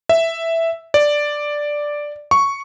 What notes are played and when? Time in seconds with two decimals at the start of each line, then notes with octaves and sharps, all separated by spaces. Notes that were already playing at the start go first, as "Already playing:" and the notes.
0.09 E5
0.94 D5
2.31 C#6